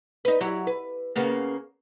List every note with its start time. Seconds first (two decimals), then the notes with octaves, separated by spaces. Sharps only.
0.25 D#4 B4
0.41 F#3 E4 G4
0.67 B4
1.16 C#3 A#3 B3